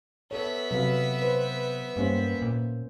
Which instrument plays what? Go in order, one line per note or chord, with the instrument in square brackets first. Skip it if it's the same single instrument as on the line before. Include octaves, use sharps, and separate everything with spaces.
[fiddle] B3 E5 [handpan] A4 C#5
[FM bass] C3 [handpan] F#3 B4 F5
[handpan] B4 C5
[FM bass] G2 [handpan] A#3 C#4 C5
[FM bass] A#2